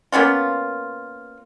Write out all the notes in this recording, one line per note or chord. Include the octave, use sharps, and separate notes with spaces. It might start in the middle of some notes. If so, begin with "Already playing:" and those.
A#3 B3 C#4 F4